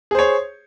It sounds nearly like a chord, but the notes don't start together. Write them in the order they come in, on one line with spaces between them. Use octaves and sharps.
G#4 C5 C#5